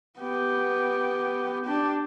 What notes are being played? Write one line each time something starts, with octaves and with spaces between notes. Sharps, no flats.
B3 G4
D4 G4